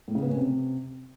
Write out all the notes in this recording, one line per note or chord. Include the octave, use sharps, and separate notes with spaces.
A2
C#3
B3
C#4
C3